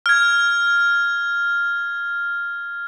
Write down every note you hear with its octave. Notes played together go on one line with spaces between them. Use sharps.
F6 G#6